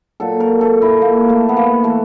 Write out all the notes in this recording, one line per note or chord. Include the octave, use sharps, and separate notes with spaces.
A#2 F#3 A4
A#4
A4
E4
A#3
A3
B3
A#3
E3 A3